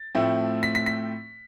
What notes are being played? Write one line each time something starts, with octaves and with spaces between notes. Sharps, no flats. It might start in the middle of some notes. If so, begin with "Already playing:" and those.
Already playing: A6
A2 F3 A3 C4 E4
B6
B6
B6